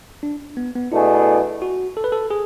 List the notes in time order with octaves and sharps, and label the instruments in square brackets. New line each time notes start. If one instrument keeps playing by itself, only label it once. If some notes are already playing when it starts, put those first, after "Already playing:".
[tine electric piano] D4
B3
B3
[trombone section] B2 A3 D4 G#4 [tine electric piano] E4
[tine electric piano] F#4
A4
B4
A4
G#4